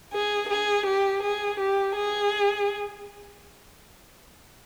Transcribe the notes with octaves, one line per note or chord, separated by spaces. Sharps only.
G#4
G#4
G4
G#4
G4
G#4